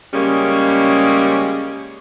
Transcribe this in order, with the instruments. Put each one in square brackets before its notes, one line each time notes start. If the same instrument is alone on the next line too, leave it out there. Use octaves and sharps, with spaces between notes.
[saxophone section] C#3 G3 G#3 A#3 C#4